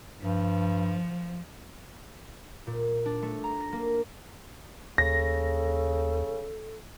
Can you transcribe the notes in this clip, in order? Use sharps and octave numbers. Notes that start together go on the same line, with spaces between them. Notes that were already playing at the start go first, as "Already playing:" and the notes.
G2 F3
A#2
D4
A3
A#5
A#6
A#3
D#2 C#3 A4 A#6